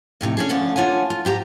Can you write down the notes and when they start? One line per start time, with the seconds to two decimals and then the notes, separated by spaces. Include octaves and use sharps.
0.21 F2 A2 C3 D#4
0.37 C#4 D4 G#4
0.49 D2 D3 F3 A3 C#4 D5
0.76 A#3 D4 F4 C#5 F#5 G#5
1.10 F4
1.25 G#2 G4 G#5 A#5